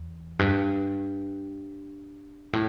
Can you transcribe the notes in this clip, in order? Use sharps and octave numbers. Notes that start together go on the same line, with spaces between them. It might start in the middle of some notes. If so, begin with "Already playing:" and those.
Already playing: E2
G2
A2